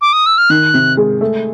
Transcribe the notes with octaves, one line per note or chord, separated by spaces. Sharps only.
D6
D#6
E6
F6
D#3 F#6
C3
G#3
A3